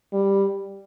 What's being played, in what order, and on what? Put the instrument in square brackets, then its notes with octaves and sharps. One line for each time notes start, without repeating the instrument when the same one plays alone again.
[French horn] G3